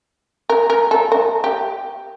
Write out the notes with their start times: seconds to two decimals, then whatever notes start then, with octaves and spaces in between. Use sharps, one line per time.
0.49 A#4
0.70 A#4
0.91 A4
1.12 A#4
1.44 G4